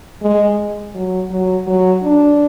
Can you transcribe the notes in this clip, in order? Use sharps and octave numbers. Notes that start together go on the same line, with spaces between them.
G#3
F#3
F#3
F#3
D4